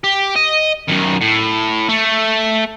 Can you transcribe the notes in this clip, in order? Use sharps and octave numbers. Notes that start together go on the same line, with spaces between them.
G4
D#5
F#2 D#3
A2
A3